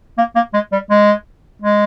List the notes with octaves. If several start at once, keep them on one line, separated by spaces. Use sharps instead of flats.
A#3
A#3
G#3
G3
G#3
G#3